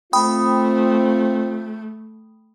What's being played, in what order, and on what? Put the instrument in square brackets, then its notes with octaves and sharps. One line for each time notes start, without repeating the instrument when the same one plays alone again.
[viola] A3 [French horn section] C4 F4 [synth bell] G5 B5 D#6